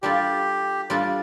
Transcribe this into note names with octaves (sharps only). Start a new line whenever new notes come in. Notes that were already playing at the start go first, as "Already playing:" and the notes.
G3 D4 F4 G4 A4
G3 D4 F4 A4